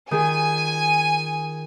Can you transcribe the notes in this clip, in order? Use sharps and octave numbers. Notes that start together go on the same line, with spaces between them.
D#3 F4 G#4 G#5